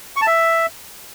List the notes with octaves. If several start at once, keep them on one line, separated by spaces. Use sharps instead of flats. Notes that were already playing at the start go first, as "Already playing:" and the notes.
C#6
A5
E5